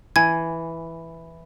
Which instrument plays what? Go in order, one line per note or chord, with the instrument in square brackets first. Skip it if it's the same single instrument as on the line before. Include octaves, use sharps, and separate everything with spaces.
[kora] E3 [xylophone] G#5 G#6